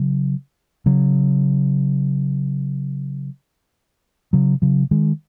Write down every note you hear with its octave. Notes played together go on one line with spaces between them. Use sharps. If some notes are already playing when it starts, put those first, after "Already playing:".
Already playing: C#3 F#3
C#3 F#3
C#3 F#3
C#3 F#3
D#3 G#3